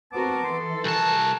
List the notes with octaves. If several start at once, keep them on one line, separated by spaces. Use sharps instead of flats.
B3 C4 F#4 A#4 A5 D6
E3 A4 C6
C2 F#4 A#4 G#5 A5